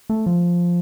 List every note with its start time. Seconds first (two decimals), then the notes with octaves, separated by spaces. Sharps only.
0.10 A3
0.26 F3